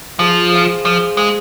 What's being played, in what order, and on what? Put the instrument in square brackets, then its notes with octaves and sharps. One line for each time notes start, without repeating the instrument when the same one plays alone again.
[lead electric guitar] F3 [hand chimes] G#4 C5 F5
[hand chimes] G#4 C5 F5
[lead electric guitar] F3 [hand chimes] G#4 C5 F5
[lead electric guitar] G#3 [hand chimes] G#4 C5 F5